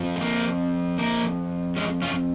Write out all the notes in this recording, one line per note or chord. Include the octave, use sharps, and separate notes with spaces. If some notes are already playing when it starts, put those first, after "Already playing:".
Already playing: F2 F3
G#3
A#3
A#3
G#3 C#4
C#4 F4